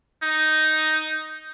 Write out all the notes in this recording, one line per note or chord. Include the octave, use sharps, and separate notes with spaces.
D#4